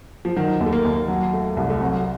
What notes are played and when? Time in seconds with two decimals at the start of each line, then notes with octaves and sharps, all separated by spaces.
0.25 F3
0.36 D#3 F#3
0.61 D#2
0.66 A3
0.73 A#3
0.85 D#2
1.08 F#3
1.33 A3
1.57 C2
1.70 A3
1.81 F#3 C4